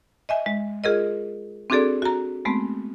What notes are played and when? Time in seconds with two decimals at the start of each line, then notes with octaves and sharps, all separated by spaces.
0.29 D#5 E5 G#5
0.46 G#3
0.84 F4 G#4 A#4 D#5
1.70 C4 D4 F#4 G#4 A4 D5
2.02 F#4 A#5
2.45 G#3 A3 B3 C4